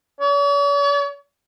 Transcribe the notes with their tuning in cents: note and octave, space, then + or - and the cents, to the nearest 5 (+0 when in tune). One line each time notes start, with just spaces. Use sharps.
C#5 +45